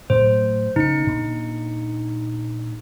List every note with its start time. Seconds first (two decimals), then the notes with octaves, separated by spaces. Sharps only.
0.10 A2 F#3 C5
0.76 C#3 A#3 D#4 C#7
1.05 A#2 D4